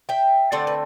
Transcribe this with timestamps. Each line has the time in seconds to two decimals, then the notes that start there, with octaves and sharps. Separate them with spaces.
0.09 E5 G5
0.52 D3 A3 C4 D5 F#5
0.67 B4